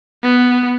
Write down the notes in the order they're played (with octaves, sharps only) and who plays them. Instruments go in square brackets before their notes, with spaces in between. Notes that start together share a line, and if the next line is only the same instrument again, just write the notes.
[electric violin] B3